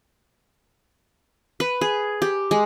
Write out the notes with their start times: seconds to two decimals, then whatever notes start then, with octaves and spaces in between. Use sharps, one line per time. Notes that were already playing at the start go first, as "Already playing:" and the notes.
1.60 B4
1.81 G#4
2.22 G4
2.51 G#3